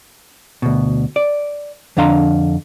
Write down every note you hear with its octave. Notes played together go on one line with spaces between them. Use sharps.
D2 B2
D5
F2 D3 D4 F5 A#5 C6